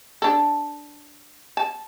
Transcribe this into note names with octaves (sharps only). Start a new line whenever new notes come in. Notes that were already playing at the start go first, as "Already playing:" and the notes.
D4 A4
A5